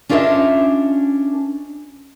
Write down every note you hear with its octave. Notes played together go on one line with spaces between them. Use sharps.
C#4 D4 F4 A#4 D#5 E5